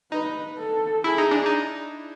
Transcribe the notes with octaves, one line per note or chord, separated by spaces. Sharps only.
D#4 B4
A4
E4 G#4
D#4
D4
D#4